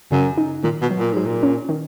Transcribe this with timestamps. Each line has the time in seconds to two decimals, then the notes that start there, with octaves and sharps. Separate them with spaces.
0.12 F#2 C#3
0.37 D#4
0.64 A#2 D#3
0.82 B2
0.90 F#3
0.99 A#2
1.13 G#2 F#3
1.26 A#2
1.43 C#4
1.69 D#3